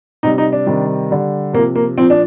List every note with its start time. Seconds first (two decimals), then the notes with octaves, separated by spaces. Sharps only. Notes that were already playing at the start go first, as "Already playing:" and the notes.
0.23 C3 G3 D#4
0.38 D#4
0.52 D4
0.66 C3 D#3 G3
1.11 D3 G3
1.53 C3 A#3
1.58 F3
1.75 A#3
1.97 A#2 F3 C4
2.10 D4